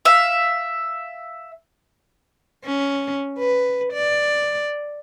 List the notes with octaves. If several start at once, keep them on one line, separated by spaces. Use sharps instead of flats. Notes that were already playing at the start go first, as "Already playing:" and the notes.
E5 F5
C#4
B4
D5